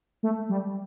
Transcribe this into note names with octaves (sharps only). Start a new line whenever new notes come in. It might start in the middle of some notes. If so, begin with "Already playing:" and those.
A3
G3